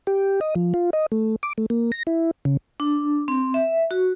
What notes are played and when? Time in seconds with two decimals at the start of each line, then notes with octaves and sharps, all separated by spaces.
0.07 G4
0.41 D#5
0.55 F3
0.74 F4
0.93 D#5
1.12 A3
1.43 D6
1.58 A3
1.70 A#3
1.92 A#6
2.07 E4
2.45 C#3
2.80 D4
3.28 C4
3.54 E5
3.91 F#4